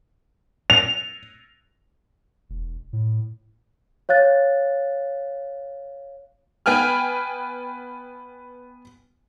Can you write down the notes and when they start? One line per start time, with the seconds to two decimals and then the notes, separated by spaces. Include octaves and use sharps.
0.70 F7
2.50 E1
2.93 A2
4.09 C#5 F5 F#6 A6
6.66 B3 B4 G5 G#5 F6